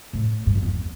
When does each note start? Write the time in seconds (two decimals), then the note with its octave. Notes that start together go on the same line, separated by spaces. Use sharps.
0.13 A2
0.46 G2
0.55 F2
0.63 E2